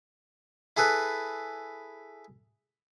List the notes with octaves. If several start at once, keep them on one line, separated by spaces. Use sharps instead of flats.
E4 G#4 A4 B4